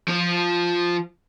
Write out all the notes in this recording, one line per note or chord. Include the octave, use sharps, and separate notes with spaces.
F3 F4